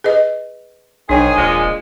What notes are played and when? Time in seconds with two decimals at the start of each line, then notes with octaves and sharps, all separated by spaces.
0.04 G#4 B4 D#5
1.09 B1 G#2 D#3 D4 G#4 C#5 G5 G#5
1.36 D#1 A#2 F3 G#3